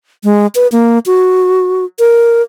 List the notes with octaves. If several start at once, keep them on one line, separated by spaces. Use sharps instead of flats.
G#3
B4
A#3
F#4
A#4